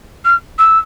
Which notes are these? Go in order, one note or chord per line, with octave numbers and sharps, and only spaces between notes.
F6
E6